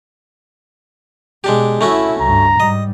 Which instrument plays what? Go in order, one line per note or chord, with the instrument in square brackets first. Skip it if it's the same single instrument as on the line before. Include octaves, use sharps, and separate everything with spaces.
[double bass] B2 [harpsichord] G#3 D4 G4
[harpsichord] A3 C#4 F#4 [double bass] E4
[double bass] C#2 G2 [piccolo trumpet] A#5
[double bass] G#2 G3 [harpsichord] D#5